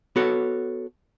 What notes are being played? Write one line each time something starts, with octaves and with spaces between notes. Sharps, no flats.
B3 F#4 A4 C#5